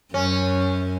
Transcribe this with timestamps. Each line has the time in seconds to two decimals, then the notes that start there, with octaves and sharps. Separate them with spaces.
0.13 F#2 C#4